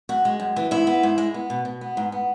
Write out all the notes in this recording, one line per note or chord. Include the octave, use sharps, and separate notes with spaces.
F#2 F#4
G#3
F#2
E3
G#2 E4
B3
G#2
G#3
B3
B2
B2
B3
G#2
B3